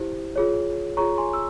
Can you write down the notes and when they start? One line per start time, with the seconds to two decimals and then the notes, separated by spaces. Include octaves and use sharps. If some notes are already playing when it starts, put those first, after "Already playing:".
Already playing: E4 G4 C5
0.36 F4 G#4 C#5
0.97 F4 G#4 C#5 A#5 C#6
1.18 G#5 C6
1.33 E6